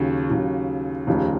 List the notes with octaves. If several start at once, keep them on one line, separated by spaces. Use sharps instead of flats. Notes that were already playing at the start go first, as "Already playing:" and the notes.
Already playing: D#2 C#3 F#3
D#2 C#3 F#3
F1 D#2 C#3 F3